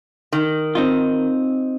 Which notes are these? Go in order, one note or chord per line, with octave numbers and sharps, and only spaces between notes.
D#3
C4 D#4 F4